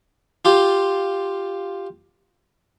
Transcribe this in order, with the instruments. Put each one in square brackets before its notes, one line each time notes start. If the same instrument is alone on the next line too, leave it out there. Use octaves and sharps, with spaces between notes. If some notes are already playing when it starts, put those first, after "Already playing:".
[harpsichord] F4 G4